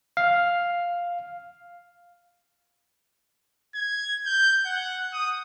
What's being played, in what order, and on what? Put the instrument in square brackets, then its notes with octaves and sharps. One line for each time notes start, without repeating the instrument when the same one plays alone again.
[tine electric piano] F5
[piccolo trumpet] G#6
G6
F#5
D#6